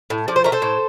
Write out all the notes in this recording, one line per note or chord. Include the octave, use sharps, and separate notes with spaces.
A2
F3 D5
C5
A3 A#4
A4 C5
A2